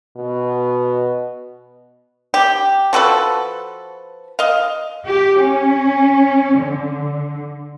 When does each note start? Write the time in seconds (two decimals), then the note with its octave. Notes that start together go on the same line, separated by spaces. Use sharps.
0.16 B2
2.34 G4
2.93 F3 F#4 A4 B4
4.39 D#5 F5
5.03 G4
5.39 C#4
6.56 D3